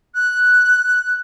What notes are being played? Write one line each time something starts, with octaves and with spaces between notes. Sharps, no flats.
F#6